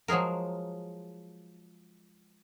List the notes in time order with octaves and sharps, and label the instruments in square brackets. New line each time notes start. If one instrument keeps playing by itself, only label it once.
[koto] F3 F#3 G#3 G#4 A#4